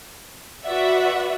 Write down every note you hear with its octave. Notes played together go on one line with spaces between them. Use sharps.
F#4 B4 D5 E5 F#5